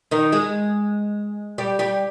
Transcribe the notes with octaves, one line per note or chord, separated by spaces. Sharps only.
D#3 D#4
G#3 G#4
G3 G4
G3 G4